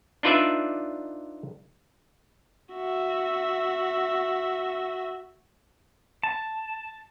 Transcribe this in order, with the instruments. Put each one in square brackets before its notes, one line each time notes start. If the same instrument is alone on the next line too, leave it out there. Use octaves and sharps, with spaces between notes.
[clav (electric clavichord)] D4 D#4 F4 B4 D5 E5
[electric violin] F#4 E5
[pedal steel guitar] A5